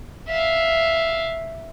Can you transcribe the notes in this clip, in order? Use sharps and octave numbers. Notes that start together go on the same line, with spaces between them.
E5 F5